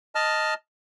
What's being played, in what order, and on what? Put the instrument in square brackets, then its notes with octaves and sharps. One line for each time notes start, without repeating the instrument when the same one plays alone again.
[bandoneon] D#5 A5 F6